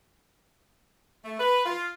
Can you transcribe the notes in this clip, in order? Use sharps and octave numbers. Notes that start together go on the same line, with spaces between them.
A3
B4
F4